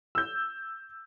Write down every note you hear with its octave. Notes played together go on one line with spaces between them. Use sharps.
E6 G6